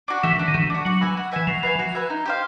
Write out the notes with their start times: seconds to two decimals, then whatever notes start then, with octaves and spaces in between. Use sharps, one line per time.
0.08 D4 F#4
0.23 E3 A3
0.39 D4 F#4
0.48 D#3
0.54 E3 A3
0.70 D4 F#4
0.85 F#3 F#4
1.01 B4 E5 G#5
1.17 F#4
1.32 E3 B4 E5 G#5
1.47 F3 F#4
1.63 B4 E5 G#5
1.79 F#4
1.95 B4 E5 G#5
2.10 D#4
2.26 G4 C5 F5